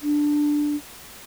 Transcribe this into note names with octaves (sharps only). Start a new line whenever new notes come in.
D4